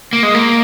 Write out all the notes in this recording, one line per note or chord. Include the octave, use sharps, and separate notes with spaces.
A#3
G#3
A#3